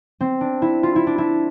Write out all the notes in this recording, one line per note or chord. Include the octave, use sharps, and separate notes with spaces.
C4
D4
E4
F4
E4
D4
E4